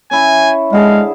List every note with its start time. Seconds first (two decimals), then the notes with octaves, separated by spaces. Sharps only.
0.11 C#4 E4 G#5
0.73 D3 G#3 G#4 F5 A5